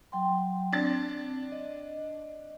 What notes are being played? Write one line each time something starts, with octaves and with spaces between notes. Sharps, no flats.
F#3 G5 C6
C4 D4 A6
D#5